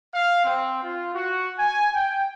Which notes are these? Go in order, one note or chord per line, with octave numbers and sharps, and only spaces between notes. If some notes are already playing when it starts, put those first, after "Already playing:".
F5
C4
F4
F#4
G#5
G5